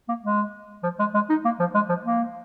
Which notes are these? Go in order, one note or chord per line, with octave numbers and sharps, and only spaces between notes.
A#3
G#3
F3
G#3
G#3
D#4
A#3
F3
G#3
F3
A#3